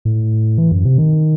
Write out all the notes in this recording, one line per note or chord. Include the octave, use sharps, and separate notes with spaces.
A2
E3
F#2
C3
D#3